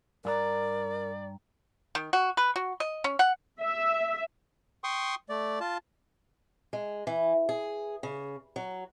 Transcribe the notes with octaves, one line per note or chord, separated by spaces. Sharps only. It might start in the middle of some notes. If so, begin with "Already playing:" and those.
G2 G#4 A#4 D5 A#5
D#3
F#4
B4
F#4
D#5
C#4
F#5
E5
G5 C6 C#6 D#6
A3 D5
F4 A5
G#3
E3
G#4
C#3
F#3